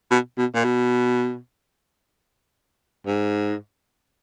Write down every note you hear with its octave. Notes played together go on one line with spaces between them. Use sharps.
B2
B2
A#2
B2
G#2